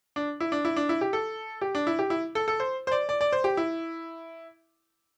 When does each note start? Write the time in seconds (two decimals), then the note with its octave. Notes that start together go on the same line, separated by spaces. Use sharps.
0.16 D4
0.40 E4
0.52 D4
0.65 E4
0.76 D4
0.89 E4
1.01 G4
1.13 A4
1.61 G4
1.75 D4
1.87 E4
1.99 G4
2.10 E4
2.35 A4
2.48 A4
2.60 C5
2.87 C5
2.91 D5
3.09 D5
3.21 D5
3.32 C5
3.44 G4
3.57 E4